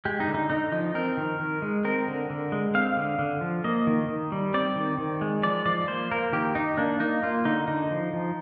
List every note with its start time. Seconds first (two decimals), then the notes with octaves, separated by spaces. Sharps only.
0.05 G#3 G4
0.20 D#4
0.27 D3
0.34 D#4
0.50 D3 D#4
0.72 F3 D#4
0.95 C4 A#4
1.17 D#3
1.39 D#3
1.62 G#3
1.84 C4 A#4
2.08 D3
2.30 D3
2.52 G#3
2.75 C4 F5
2.97 D3
3.19 D3
3.41 F3
3.64 A#3 D#5
3.87 D#3
4.09 D#3
4.32 G3
4.54 C4 D5
4.76 D#3
4.98 D#3
5.21 G#3
5.43 F3 D5
5.66 F3 D5
5.88 A#3 C5
6.11 A#3 A#4
6.33 D#3 G4
6.55 D#3 D#4
6.78 A#3 D4
7.00 A#3 D#4
7.23 A#3 F4
7.45 D3 D#4
7.68 D3 D#4
7.91 F3
8.13 F3